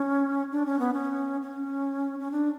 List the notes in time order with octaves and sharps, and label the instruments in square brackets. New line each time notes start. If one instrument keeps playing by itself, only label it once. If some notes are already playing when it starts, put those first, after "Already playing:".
Already playing: [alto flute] C#4
D4
C#4
B3
C#4
C#4
C#4
D4